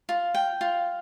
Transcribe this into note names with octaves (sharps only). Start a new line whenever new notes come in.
F4
G5
F4